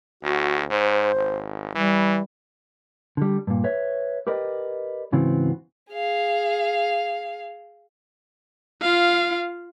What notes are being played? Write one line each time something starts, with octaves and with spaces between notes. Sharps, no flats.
D2 F#4
G#2 C5
G#1
E3 G3
D3 G3
G2 A#2
B4 C#5 E5
G4 A#4 B4 D5 D#5
G#2 C#3 E3 B3 C4 F#4
G#4 F5
F4 F5